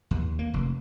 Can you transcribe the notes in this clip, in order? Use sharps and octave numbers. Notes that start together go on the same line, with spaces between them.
D#2
A#3
F1